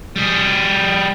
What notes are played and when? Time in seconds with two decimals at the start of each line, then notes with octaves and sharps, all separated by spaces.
0.16 G3 G#4